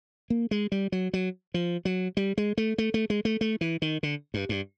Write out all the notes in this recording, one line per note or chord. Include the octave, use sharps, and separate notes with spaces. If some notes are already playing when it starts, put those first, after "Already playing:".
A#3
G#3
G3
F#3
F#3
F3
F#3
G3
G#3
A3
A3
A3
G#3
A3
A3
E3
D#3
D3
G2
G2